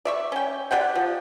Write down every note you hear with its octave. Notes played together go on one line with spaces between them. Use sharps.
D5 E5 C#6
C#4 G5
G4 D5 F#5 G5
F3